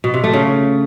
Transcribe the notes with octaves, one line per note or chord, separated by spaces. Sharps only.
B2
C3
A3
C#3